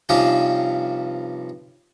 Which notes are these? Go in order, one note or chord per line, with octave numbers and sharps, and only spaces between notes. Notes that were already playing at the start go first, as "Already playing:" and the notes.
G2 C3 F3 C#4 D#4 G4